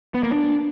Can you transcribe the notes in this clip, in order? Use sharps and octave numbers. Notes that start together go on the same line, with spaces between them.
B3
A#3
D4